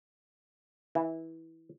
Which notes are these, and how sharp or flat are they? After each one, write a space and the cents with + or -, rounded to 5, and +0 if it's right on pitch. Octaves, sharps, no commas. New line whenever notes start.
E3 -20